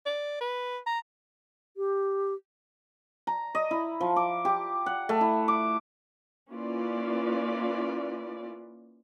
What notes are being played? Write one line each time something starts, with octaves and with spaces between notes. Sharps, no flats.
D5
B4
A#5
G4
A#5
D#5
E4
F3
D6
G4
F#5
A3
E4
D6
A#3 C#4 E4 F4 B4 D5